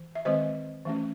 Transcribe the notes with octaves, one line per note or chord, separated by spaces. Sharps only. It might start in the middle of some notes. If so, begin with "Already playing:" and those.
Already playing: E3
E5
D#3 G#3 C4 C5 D#5
E3 A3 C#4